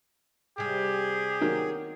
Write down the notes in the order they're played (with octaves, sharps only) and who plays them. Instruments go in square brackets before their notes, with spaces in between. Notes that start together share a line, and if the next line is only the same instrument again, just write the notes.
[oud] C3 G3 [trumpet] G4 [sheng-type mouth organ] G#4
[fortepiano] D#3 F#3 A#3